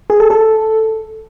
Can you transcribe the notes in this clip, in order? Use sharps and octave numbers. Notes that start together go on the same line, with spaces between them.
G#4
A4
A4